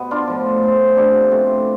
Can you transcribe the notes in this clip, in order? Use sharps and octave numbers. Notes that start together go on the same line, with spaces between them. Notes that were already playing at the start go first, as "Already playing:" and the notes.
Already playing: B2 B3
D4 F4
A2 F3
A2 F3
C3 F3 B3 D4
B2 A3 C4